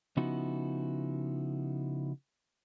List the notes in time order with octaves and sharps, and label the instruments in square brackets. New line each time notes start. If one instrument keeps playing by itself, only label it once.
[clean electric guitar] C#3 F3 B3 D#4 E4 F#4